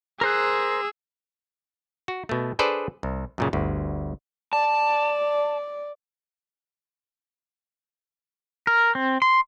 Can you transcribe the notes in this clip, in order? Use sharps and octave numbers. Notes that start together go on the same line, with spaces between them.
G#4 A#4 C5 E6 F#6
F#4
B2 A3
D4 G#4 A4 B4 C5 D5
C2
F#2 A#2 C#3
G1 D2
D5 A5
A#4
C4
C6